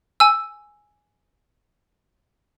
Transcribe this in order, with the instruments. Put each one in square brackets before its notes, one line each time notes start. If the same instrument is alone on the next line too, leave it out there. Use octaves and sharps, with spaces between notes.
[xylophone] G#5 E6